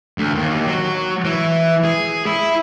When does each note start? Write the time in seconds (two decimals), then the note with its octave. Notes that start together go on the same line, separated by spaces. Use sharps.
0.18 D2
0.35 D#2
0.67 F#3
1.25 E3
1.84 G#4
2.26 E4